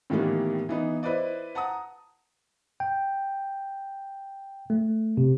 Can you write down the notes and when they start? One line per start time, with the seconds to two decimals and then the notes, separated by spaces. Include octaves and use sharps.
0.10 A2 D#3 E3 G3 A#3 B3
0.69 E3 B3 D#4
1.03 E4 B4 C5 D5 D#5
1.55 F#5 A5 A#5 D#6
2.80 G5
4.70 A3
5.17 C3